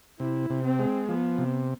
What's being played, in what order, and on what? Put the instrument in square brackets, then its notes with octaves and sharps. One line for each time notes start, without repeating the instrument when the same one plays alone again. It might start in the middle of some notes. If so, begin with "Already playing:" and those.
[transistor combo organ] C3 [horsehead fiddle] E4
[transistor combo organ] C3
[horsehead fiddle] C4
[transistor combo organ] G#3
[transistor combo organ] F3 [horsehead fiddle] B3
[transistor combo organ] C3